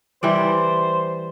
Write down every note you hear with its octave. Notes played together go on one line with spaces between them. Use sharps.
E3 G3 C5 D5